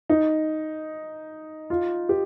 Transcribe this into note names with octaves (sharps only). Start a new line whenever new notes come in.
D#4
F4
G4